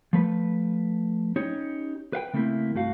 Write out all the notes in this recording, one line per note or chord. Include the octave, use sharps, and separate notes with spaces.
F3 A3 B4
C#4 D#4 G4 C#5
B4 F5 G5
C#3 A3 A#3 C4 E4
C2 G2 A3 F#4 F5